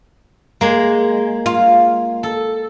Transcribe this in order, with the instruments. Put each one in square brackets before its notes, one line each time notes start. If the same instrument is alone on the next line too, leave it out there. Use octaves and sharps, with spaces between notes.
[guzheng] G#3 A#3
[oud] F4
[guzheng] A4